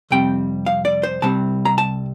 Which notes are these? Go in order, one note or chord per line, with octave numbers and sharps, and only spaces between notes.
F2 C3 G3 C4 G5
F5
D5
C5
C2 C3 G3 C4 A5
A#5
A5